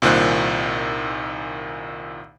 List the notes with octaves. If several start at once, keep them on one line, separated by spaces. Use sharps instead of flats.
C2 A#2 D#3 C5 F#6